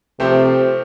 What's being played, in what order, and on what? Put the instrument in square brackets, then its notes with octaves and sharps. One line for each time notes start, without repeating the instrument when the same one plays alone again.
[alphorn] C3 [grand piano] F3 A3 C4 G4 C5